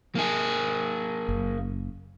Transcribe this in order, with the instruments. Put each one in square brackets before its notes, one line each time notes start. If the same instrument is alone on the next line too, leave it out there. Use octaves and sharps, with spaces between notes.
[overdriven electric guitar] A#3 G#4
[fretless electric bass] F#1